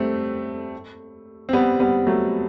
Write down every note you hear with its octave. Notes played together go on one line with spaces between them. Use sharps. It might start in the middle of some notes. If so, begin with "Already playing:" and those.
Already playing: G3 A3 C4
C4
G3 B3
G3 B3
F#3 A3